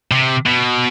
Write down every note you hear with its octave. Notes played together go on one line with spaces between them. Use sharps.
C3
B2